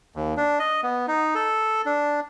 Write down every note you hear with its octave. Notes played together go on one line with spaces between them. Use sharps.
D#2
D4
D#5
B3
D#4
A4
D4